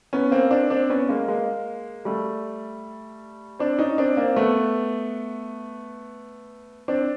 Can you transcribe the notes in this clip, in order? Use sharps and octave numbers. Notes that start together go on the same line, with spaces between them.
B3 C#4
A#3 C4
C4 D4
C4 D4
B3 C#4
G#3 A#3
G#3 A#3
G3 A3
C4 D4
C#4 D#4
C4 D4
A#3 C4
A3 B3
C4 D4